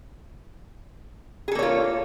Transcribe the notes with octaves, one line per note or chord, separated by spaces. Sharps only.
A#3 F4 G#4 A4 C#5